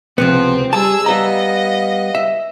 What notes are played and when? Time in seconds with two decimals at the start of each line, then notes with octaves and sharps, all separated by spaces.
0.18 C#2 C3 F3 B3 C4
0.73 G3 G#4 A5 E6
1.06 G3 B3 D#5 F5 A#5
2.15 E5